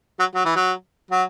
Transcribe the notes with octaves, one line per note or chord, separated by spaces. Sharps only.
F#3
F#3
E3
F#3
F#3